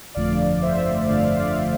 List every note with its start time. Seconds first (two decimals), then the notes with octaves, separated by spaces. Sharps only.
0.15 G1 F2 D3 F3 A3 D5 F5
0.62 C5 E5
1.08 G1 F2 D3 F3 A3 D5 F5
1.39 D5 F5